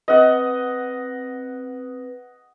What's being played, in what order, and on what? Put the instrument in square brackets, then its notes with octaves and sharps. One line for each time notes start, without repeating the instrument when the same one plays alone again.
[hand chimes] C4 B4 [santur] D#5 F#5